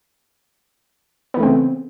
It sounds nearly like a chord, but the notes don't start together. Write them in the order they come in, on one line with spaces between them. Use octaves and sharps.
B3 E3 A3 C4 C#3